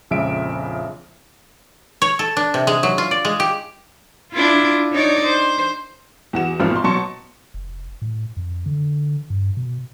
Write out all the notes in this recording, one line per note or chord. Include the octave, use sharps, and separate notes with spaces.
A#1 F2 C#3 G#3 E5 D7
C#5
A4
D4
C3
G#3
F#3
F4
D5
G#3
G4
D4 E4 F4
D#4 C#5 D5
C5
E2 F#4 E7
G#1 F3 F6
B2 C6
B2 F#3 A5 C6 C#6 C#7
F1
A2
F2
D3
G2
B2